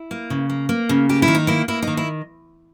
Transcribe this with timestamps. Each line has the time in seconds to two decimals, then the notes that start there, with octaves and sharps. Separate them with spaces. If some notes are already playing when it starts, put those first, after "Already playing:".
Already playing: E4
0.11 A#3
0.30 C#3
0.49 A#3
0.69 A#3
0.89 C#3
1.09 A#3 G4
1.22 E4
1.28 D#3
1.35 D#4
1.47 A#3 E4
1.68 A#3 E4
1.82 D#3 D#4
1.97 E4